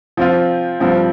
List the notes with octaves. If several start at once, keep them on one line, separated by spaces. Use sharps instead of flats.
F3 C4 F4
G2 F3 C4